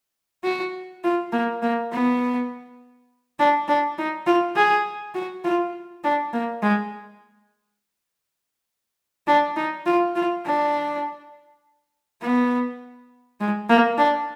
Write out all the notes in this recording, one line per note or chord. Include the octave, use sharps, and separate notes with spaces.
F#4
F4
A#3
A#3
B3
D4
D4
D#4
F4
G#4
F#4
F4
D4
A#3
G#3
D4
D#4
F4
F4
D4
B3
G#3
A#3
D4